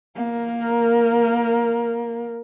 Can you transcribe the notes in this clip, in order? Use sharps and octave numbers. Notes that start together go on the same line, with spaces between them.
A#3 A#4